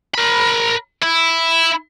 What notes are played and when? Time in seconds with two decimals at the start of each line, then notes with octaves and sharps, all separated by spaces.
0.14 A#4 B5
1.02 E4